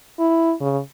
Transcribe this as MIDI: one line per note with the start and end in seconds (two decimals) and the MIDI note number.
0.19 0.53 64
0.60 0.79 49